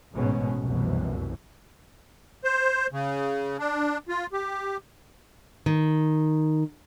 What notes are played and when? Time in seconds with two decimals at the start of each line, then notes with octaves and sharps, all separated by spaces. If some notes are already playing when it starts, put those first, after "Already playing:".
0.13 A1 G#2 B2 G#3 C#4
0.63 F1 C2 F#2 B2 E3
2.44 C5
2.92 C#3
3.59 D4
4.09 F4
4.32 G4
5.66 D#3